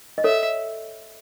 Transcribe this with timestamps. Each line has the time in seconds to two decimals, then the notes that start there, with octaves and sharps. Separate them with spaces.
0.18 D#5
0.24 A4 C#5 E5